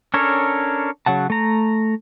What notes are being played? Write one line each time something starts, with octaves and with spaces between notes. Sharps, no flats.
C#4 D4 A4 A#4 C#5
C#3 F#3 F#5 A5
A3 A#5